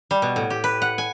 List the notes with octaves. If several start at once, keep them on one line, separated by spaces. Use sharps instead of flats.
G3
B2
A2
G4
B4
F#5
G#5